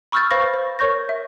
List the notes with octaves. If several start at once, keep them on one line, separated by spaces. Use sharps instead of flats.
B5 C#6 E6 F6 G6 A6
B4 C5 F5 B5 C#6 A#6
C5
A#4 C#5 C#6 G6 A#6
E5